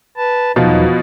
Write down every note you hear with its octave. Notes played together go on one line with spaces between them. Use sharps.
B4 A5
E2 B2 F3 F#3 D#4